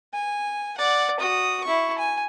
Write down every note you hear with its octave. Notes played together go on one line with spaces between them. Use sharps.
G#5
D5 F#5
F#4 D#6
E4 C#6
G#5